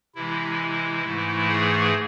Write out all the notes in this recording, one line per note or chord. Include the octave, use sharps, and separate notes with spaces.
C3 E3 G#3 E4
G#2 E3 A3
G#4